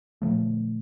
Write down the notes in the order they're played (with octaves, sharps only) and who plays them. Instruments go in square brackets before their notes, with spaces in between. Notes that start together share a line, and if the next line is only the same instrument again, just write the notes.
[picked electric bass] A#2 D3 F3 A3